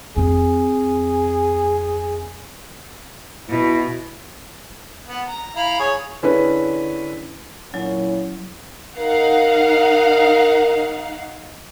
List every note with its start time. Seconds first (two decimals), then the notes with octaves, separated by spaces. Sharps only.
0.16 F2 C4 G#4
3.50 B2 E4
5.08 B3
5.27 A#5
5.56 E4 F5 A#5
5.79 G#4 C#5
6.23 D3 C#4 E4 G#4 B4
7.74 A#2 F#3 C#4 E4
8.99 D#4 A#4 F5 F#5